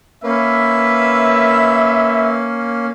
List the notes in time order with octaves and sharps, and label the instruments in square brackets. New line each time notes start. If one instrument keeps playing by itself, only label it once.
[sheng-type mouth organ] A#3 C#4 [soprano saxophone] B4 [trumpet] E5